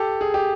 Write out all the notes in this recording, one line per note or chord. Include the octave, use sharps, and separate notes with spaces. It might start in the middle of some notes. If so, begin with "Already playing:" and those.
Already playing: G4 A4
G#4
G4